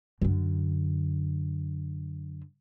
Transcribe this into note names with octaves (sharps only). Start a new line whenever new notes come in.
F#2 D3